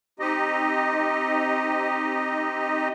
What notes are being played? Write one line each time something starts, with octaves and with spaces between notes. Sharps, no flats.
C4 D#4 G4 D#5